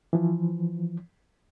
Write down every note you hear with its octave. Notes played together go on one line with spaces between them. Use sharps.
E3 F3